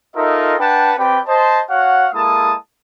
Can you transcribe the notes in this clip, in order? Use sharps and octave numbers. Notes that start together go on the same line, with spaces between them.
D#4 F4 A4 A#4 D#5 E5
D4 B4 F#5 G5 A5
C4 G4 B4 D5 G5
C5 D#5 A5
F#4 C#5 F5 F#5
G#3 A#3 E4 A4 A5 D#6